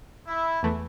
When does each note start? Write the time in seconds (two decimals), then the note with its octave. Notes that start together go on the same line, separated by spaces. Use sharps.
0.27 E4
0.63 E2 E3 A3